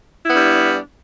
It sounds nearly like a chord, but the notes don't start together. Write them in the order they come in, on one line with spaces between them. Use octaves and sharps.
E4 B3 D4 G3